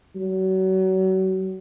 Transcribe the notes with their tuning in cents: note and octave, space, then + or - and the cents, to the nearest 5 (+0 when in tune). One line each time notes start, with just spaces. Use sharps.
F#3 +35